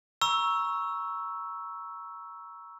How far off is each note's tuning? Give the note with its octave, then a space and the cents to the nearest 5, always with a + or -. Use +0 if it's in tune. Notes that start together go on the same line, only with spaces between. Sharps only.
A#5 +20 C#6 +0 E6 +0